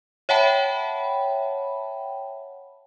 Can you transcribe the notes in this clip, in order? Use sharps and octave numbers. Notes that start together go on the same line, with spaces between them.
C#5 E5 F#5 G5 A5 B5